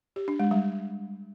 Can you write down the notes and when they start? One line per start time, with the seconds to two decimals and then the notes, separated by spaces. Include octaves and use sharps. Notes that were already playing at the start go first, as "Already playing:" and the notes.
0.16 G4
0.28 D4
0.40 G#3
0.51 G3